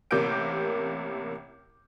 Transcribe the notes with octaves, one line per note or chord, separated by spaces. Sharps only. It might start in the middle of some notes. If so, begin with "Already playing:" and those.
A1 C3 A#3 D6 G6 D7